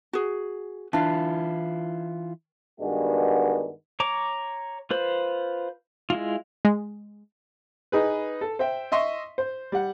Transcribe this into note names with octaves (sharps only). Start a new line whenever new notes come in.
F#4 G#4
E3 D4 E4 F4 F5
G2 D#3 G#3 B3 D4 F#4
C#5 A#5 D6
F4 B4 C5
G#3 E4 F4
G#3
D#4 G#4 B4
A4
C5 E5 G5
D#5 E5 C6 C#6
C5
G3 F#5